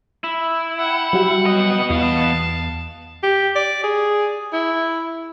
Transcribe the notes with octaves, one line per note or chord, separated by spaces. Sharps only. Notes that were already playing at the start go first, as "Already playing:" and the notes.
E4
F#5 G5
F#3 G3 F#4
B3 D#5
E2 F5 A5
G4
D5
G#4
E4